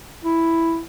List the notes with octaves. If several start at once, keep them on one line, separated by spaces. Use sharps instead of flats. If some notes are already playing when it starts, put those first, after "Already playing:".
E4